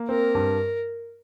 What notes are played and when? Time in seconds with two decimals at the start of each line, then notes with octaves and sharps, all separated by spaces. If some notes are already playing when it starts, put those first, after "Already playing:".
Already playing: A#3
0.08 C4 A#4
0.35 G2